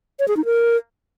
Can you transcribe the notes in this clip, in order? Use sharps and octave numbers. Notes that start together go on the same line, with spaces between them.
C#5
G#4
D#4
A#4